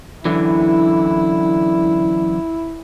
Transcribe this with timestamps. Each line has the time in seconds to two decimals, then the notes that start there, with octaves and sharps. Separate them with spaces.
0.25 F#2 D3 E3 E4